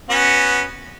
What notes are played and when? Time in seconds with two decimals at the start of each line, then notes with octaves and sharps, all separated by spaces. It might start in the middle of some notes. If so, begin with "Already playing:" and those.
0.10 B3 C#4 F#4